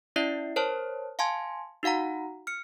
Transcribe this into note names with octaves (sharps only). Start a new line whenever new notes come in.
C#4 E4 D5 E5 C7
A#4 C5 C#5 A5
F5 G#5 A5 C6 G#6
D#4 F#4 F5 F#5 A#5
F6 C#7